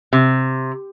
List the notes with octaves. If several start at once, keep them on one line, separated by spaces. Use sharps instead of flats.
C3